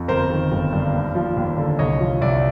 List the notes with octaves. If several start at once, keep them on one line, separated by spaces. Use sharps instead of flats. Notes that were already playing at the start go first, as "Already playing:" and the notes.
Already playing: F2
G1 A#4 C5
D#3
G1
G2
D#2
F3
D#2
D3
C2 C#5 D#5
F3
C2 D5 E5